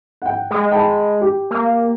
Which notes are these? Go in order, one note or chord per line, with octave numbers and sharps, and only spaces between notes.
F#5 G5
G#3
G5 A5 B5
G4
A#3